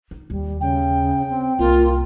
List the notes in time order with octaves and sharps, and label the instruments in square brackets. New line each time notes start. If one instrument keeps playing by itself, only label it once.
[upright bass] D#4
[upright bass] D#2 [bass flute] G3
[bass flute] C#3 [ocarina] G5
[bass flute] C4
[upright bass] C2 [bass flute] A#3 [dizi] F4